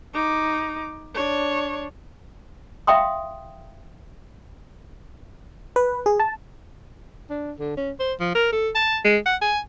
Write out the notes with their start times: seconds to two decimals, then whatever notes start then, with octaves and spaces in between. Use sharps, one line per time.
0.14 D#4 D6
1.14 D4 C#5
2.87 E5 F5 G5 C6 D#6
5.76 B4
6.06 G#4
6.20 A5
7.30 D4
7.59 D3
7.77 C#4
8.00 C5
8.20 F3
8.35 A#4
8.52 A4
8.75 A5
9.05 G#3
9.26 F#5
9.42 G#5